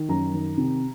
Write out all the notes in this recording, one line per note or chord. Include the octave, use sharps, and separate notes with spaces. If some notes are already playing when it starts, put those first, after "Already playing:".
Already playing: D#3
F#2 A#5
D#3
C3